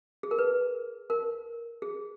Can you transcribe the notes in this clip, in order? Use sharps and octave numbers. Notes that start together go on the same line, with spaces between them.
G#4
A#4
B4
A#4
G#4